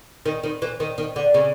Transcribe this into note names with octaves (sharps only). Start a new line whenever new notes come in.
D#3
D#3
E3
D#3
D#3
D3
C#3